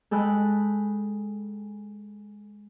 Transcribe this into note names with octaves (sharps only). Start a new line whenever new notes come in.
G#3 A4 G5 B5 F#6